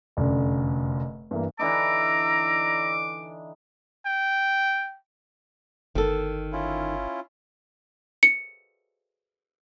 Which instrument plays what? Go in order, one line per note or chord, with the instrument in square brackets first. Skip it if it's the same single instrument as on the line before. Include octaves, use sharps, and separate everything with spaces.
[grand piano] F1 F#2 D3
G2 E3 A#3
[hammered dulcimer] D3 E3 D#4 [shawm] A#5 [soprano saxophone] D6 [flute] E6
[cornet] G5
[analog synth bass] G1 [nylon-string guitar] D#3 A4
[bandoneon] C#4 E4 F4
[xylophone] C#7